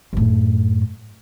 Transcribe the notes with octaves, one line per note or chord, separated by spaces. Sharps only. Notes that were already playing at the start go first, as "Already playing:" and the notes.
F#2 A2